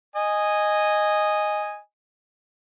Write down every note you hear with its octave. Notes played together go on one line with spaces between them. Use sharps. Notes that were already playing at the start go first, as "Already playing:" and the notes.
D#5 G#5